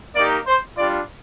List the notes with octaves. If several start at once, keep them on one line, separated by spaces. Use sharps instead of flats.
A#3 D#4 G4 D5
C5
G3 D4 F4 D5